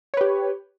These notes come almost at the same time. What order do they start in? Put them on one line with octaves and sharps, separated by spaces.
C#5 B4 G4